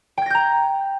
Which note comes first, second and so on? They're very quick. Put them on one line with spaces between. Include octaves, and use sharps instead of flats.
G5 G#6 A#6 G6 A#5